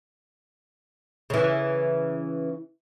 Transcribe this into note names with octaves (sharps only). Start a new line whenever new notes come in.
C#3 E3